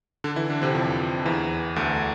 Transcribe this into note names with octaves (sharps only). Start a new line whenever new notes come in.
D3 D4
E3 E4
D3 D4
C3 C4
F2 F3
E2 E3
D2 D3